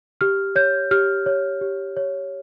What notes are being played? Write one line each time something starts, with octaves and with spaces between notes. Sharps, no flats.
G4 F6
C#5 G6
G4 F6
C#5
G4
C#5